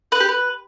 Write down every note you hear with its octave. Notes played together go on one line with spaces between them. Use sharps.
B4
G4
B4